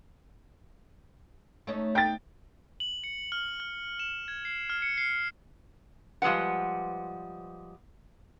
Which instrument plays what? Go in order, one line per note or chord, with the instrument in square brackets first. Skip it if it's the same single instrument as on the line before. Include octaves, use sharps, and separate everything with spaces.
[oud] A3 C#4 D#4
[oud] D#4 [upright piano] G5 A6
[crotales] F#7
C#7
F6
F6
E7
G#6
C7
F6
C#7
C7
[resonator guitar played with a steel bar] F3 G3 G#3 B4 F#5